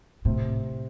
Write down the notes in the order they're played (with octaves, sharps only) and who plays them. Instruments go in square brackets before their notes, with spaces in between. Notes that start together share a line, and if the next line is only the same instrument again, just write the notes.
[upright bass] A2 [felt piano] C3 C4